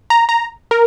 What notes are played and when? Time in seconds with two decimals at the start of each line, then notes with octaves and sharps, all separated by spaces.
0.10 A#5
0.29 A#5
0.71 A#4